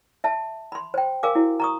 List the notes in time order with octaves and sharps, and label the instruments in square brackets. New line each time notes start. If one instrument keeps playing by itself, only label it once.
[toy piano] E5 A5
B5 C6
C5 G5
A#4 F5 G#5 D6
E4 F#4
A#5 C#6 D#6